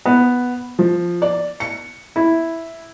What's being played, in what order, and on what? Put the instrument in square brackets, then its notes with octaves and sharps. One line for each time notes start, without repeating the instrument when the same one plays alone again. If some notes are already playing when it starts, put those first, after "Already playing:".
[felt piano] B3
F3
D5
C#7
E4